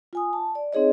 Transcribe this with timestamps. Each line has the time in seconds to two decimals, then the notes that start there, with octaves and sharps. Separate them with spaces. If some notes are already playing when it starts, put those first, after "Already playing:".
0.13 F4 G#5 D#6
0.33 A5
0.55 D5
0.73 C4 D#4 G#4 C#5 D#5